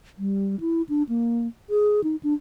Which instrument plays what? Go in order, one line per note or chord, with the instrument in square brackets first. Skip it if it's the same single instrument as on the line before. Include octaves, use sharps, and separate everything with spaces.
[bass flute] G3
E4
D4
A#3
G#4
D#4
D4